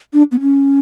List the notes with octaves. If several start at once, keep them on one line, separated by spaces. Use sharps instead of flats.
D4
B3
C#4